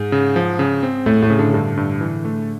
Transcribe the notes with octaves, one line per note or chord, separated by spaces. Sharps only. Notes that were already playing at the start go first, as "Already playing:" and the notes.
Already playing: G#2
C#3
F3
C#3
C4
A2 A3
A2
C#3
D3
G2 D3
G2
E3
A3